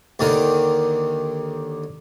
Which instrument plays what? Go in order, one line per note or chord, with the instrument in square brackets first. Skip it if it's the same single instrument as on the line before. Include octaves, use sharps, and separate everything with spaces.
[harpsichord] D#2 D3 D#3